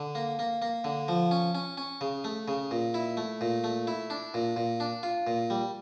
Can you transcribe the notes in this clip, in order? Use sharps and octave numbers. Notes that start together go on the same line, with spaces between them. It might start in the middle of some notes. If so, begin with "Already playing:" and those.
Already playing: D3
A#3
A#3
A#3
D3
F3
C#4
C#4
C#4
C#3
A3
C#3
A#2
E4
A3
A#2
A3
E4
D4
A#2
A#2
D4
F4
A#2
G3